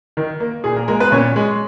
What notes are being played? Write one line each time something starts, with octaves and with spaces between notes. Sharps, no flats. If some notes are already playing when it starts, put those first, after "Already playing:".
D#3
A#3
A#2 G#4
A#3 A#4
G#3 A#3 A#4
B3 B4
A#2 C#4 C#5
G#3